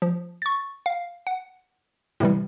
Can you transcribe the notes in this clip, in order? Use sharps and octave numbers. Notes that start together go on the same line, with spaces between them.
F3
C#6 A6
F5
F#5
A2 C3 E3 G3